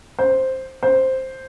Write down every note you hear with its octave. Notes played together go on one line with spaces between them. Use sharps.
C5
C5